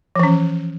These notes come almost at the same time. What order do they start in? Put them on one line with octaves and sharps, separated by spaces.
F3 E3 C#4